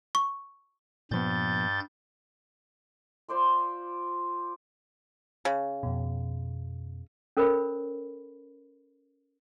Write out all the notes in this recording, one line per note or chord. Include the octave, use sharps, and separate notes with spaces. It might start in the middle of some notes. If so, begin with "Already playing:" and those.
C#6
G2 A#2 F3 B3 G6 A6
F4 C5 D5 C6
C#3
F2 B2
C#4 A4 A#4 C5 C#5 B5